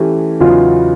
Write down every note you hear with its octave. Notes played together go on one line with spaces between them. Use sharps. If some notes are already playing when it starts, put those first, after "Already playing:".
Already playing: E3 A3 C#4 G4
E2 C#3 F#3 B3 D#4 F4